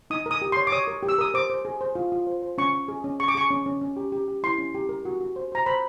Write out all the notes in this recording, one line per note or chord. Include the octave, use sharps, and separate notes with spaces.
D#4 D#6
A#4 D#6
G4
C#5 C6
D6
C#5 D#6
A#4
G4
E6
A#4 D#6
C5 D6
C5
G#4
C5
F4
F4
C5
C5
C#4 C#6
C#4
G#4
C#4
G#4 C#6
D6
G#4 C#6
C#4
C#4
C#4
G4
G4
G4
E4 C6
C#4
G4
A#4
F#4
F#4
C5
C5 A#5
C5 B5